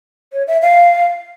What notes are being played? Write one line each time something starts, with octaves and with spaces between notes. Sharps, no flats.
C#5
E5
F5